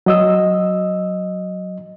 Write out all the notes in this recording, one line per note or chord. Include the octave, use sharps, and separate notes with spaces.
F#3 D#5 E6